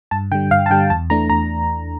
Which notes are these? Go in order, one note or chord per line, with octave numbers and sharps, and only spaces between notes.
G2 A5
D3 G3 G5
G2 F5
A5
D3 G3 G5
E2 A5
E3 A3 D4 A#5
E2 A#5